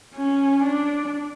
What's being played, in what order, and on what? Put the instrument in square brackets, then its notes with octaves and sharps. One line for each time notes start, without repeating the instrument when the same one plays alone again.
[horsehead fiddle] C#4
D4